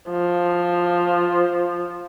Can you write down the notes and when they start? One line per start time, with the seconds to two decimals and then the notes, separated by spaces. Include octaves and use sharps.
0.10 F3